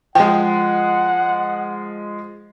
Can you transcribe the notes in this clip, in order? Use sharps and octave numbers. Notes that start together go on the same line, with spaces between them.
F3 G#3 F#5 G5